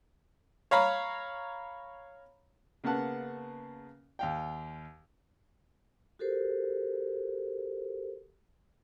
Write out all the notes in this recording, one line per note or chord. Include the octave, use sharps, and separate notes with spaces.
C#5 F5 A#5 B5
C#3 A#3 B3 F#5 A5 F#6
D#2 F5 G5
F#4 G4 A4 A#4 C5